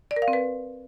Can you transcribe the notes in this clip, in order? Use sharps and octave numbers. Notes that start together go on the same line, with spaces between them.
D5
A#4
F5
C4
B4